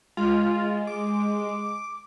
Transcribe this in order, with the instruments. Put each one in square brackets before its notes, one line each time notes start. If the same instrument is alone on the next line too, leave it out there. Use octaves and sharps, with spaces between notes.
[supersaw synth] G#3 [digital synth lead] F4
[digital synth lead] D6